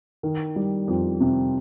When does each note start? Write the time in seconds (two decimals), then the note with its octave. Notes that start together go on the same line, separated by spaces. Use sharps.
0.23 D#3
0.56 G3
0.88 F2
1.20 C3